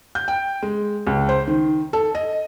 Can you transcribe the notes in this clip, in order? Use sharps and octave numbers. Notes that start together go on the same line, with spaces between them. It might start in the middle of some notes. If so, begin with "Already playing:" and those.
G6
G5
G#3
C#2
C5
D#3
A4
D#5